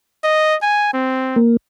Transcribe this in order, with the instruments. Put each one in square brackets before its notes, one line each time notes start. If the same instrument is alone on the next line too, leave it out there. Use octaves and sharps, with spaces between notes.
[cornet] D#5
G#5
C4
[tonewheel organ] A#3